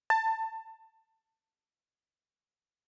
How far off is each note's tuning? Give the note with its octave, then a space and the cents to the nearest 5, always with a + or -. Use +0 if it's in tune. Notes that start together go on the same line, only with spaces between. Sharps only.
A5 +15